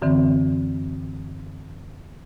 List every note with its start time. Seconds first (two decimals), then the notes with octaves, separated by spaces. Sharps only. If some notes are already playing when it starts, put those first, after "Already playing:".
0.02 F#2 D3 E3 C4